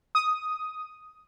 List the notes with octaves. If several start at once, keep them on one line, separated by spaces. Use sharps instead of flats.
D#6